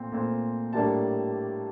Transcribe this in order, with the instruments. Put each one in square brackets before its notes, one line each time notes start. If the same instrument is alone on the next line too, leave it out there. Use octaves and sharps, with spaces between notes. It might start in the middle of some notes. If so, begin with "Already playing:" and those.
Already playing: [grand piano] A#2 A3 C4
A#2 A3 C4
A2 G3 A#3 D4 A5